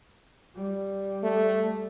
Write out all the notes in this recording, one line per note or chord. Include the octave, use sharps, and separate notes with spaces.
G3
A3